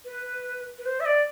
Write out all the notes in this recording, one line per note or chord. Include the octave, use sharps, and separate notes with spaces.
B4
B4
C5
E5
D5